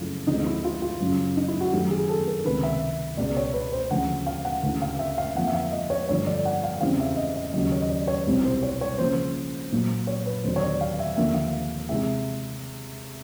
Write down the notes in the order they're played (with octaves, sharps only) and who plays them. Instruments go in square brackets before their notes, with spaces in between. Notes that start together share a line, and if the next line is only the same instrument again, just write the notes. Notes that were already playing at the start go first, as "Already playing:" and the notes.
Already playing: [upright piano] F#2 C#3 F3 A3 E4 F4
D2 D3 F3 G#3 C4 D#4
E4
F4
F4
F#2 C#3 F#3
D#4
E4
F#4
F#2 D#3 F#3 A3 G4
G#4
A4
A#4
C#2 C3 D#3 B4
E5
C#2 B2 G#3 B3 D5
C#5
B4
C5
D2 C#3 F3 F#5
F5
F#5
D2 C#3 E3
F5
E5
F5
F2 D3 F3 A#3 F#5
E5
F5
D#5
C#5
G2 D3 F3 A3 C#5
D5
F#5
F5
E2 C#3 E3 G3 C4 F5
E5
D#5
D#5
D#2 C#3 F#3 D#5
C#5
D#5
D5
C#5
C2 B2 G3 C4
C5
C#5
C#5
C#3 F3 A#3 C5
A#2 F#3 A#3
C#5
B4
D#2 D3 F#3 B3 D4 C5
C#5
D5
F5
E5
D#2 D3 F3 A#3 E5
F5
C3 E3 G#3 E5